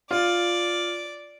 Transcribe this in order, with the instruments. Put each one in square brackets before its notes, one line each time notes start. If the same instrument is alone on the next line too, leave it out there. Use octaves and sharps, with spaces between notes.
[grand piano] F4 [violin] D5